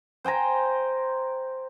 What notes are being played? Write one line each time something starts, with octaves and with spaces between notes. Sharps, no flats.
C5 G5 G#5 A#5